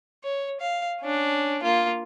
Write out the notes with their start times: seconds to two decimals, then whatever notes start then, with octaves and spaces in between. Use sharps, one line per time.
0.24 C#5
0.61 F5
1.01 C#4 D4
1.63 A#3 F4